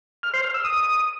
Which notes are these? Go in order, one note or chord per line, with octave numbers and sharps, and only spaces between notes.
F6
C5
F6
E6
D#6